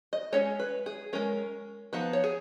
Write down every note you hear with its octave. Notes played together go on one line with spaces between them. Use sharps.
D#5
G#3 C#4 C#5
B4
G#4
G#3 C#4 A#4
F3 B3 D#4 B4
C#5
G#4